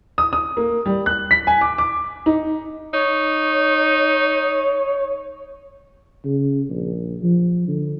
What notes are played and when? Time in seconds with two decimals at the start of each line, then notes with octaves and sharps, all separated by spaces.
0.18 D#6
0.33 D#6
0.57 A#3
0.86 G3
1.06 F#6
1.31 B6
1.47 G#5
1.61 D6
1.78 D6
2.26 D#4
2.93 D#4 C#5
6.25 C#3
6.70 A#1
7.23 F3
7.68 D3